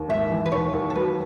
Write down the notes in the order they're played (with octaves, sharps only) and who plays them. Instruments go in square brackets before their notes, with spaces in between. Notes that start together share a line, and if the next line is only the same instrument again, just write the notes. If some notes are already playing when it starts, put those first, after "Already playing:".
Already playing: [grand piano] D#2
[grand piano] G#1 [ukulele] E5
[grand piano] E3
[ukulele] B4
[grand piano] D#2 [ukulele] C#5
[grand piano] D#2
[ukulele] A4
[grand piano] F#3 [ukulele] B4